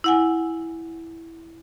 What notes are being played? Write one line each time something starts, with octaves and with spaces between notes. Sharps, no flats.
E4 F#5 G#5